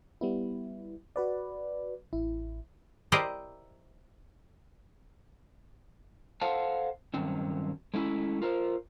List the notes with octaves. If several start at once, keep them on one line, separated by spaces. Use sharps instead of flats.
G3 B3 E4
F#4 B4 D5
A1 E4
E4 G4 A#4 C5 D5 D#5
A4 C5 F5 F#5 A5
G2 B2 D#3 F#3 C4 C#4
G#3 A3 C#4 E4
F4 A#4 C5